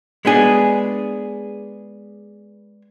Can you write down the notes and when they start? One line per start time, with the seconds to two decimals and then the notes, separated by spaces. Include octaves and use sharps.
0.25 G#3 B3 D4 G#4